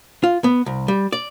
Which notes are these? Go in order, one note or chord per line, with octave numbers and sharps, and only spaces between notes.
F4
B3
C2
G3
D5